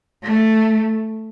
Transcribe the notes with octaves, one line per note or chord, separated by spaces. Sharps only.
A3